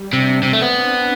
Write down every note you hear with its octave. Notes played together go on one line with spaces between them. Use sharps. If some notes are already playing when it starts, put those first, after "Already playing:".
Already playing: G3
C3 D4
C3 C4
A3
B3
D4